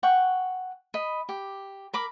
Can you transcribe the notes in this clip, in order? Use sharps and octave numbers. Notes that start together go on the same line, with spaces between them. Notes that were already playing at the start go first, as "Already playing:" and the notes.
F#5 G5 C#6
D#5 B5
G4
A#4 B5 D6